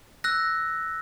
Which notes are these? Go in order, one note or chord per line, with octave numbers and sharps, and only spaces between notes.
E6 F#6 A#6